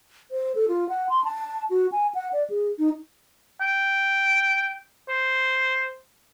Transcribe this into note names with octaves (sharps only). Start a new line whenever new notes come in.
C5
A4
F4
F#5
C6
A5
F#4
G#5
F#5
D5
G#4
D#4
G5
C5